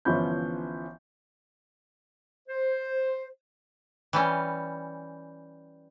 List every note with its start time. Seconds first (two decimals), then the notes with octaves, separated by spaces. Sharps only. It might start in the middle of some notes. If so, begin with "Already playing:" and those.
0.05 G1 E3 F3 C#4 B5 G6
2.49 C5
4.13 E3 G3 C#4